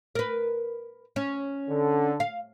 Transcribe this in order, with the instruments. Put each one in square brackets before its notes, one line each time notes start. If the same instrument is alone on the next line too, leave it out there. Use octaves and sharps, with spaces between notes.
[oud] A#4 B4
C#4
[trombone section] D3
[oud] F5